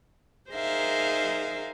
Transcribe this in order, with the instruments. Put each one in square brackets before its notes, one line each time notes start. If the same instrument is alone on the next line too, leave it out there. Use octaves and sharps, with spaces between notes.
[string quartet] D#4 G#4 A#4 C5 E5 F5